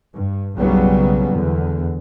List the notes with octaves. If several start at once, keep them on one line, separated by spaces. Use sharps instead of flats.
G2
F#1 B1 C#3 F#3 G3 B3
E2 D3